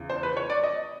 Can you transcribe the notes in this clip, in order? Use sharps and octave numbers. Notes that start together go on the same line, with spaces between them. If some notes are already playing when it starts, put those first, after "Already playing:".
Already playing: E2 C#3 E3
C5
B4
C#5
D5
D#5